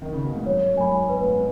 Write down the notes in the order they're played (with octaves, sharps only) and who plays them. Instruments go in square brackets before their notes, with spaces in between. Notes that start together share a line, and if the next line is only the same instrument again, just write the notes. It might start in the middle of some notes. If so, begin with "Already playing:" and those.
[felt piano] D#3
C#3
B2
G#2
[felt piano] F#2 [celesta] C#5
[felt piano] F#2
[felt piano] G#2 [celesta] G#5 B5
[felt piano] B2 [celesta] B4
[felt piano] G#2
B2